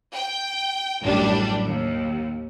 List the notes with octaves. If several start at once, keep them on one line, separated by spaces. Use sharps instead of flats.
G5
A1 F#2 G3 D4
D#2